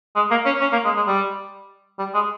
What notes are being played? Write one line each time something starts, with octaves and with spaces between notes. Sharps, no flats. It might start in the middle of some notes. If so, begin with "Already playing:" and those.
G#3
A#3
C#4
C#4
A#3
G#3
G#3
G3
G3
G#3